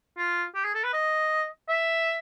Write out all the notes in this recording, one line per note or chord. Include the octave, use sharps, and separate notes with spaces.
F4
G4
G#4
A4
B4
D#5
E5